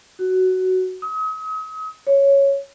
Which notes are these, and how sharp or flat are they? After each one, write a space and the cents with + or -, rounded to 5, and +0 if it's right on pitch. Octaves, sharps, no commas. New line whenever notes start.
F#4 +10
D#6 +40
C#5 +0